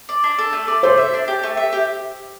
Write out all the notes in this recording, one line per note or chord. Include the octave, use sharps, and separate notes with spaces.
D5
D4
A4
A3
D5
A3 C5
E5
D4
G4
A3
E5
G4